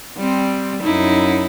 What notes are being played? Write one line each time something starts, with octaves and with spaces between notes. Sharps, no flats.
G3 C4
F#2 D#4 E4